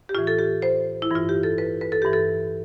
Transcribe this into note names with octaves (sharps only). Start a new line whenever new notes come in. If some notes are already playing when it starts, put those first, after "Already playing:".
G4
A2 E3 F4
A4
G4
C5
E4
G2 E3 F4
G4
A4
B4
B4
A4
G2 E3 G4
A4